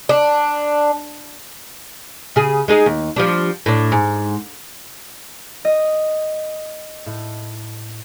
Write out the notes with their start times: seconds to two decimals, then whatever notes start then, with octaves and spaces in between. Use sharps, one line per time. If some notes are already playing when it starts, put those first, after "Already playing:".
0.09 D4
2.36 C#3 G#4
2.68 G#3 D#4 G#4
2.86 D#2
3.16 F3 G3 D4
3.66 A2 D4
3.92 G#2
5.65 D#5
7.06 A2